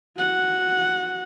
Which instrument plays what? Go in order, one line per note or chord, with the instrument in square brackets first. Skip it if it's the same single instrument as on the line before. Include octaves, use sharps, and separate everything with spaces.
[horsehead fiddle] F#4 F#5